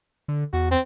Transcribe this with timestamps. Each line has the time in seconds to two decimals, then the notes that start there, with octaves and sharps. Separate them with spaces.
0.28 D3
0.53 E2 F#4
0.71 C4